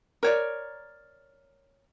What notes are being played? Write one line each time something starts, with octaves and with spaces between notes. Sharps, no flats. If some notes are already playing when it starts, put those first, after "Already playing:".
A#4 C#5 D5